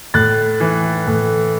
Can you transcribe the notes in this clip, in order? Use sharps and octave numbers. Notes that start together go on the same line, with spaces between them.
A2 F#6 A6
E3
A2